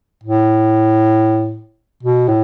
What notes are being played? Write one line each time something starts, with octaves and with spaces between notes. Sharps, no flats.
A2
B2
A2